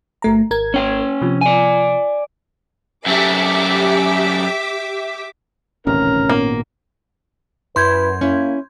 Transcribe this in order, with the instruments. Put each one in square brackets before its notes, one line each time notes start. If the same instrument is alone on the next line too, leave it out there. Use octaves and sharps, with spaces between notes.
[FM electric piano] G1 A3 A#5
G#1 A#4 G#6
[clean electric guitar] C#4 G5
[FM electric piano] C3 F3
[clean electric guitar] D5 G#5
[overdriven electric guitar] F#2 A3 [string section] G4 E5 D6
[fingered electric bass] D#1 A1 C3 [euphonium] C#4 [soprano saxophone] A#4
[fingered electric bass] G#1 A#2 B3 [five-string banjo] A#3
[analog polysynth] F#2 [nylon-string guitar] E4 [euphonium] B4 [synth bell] C6 G6 G#6
[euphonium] A#3 [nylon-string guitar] C#4 E4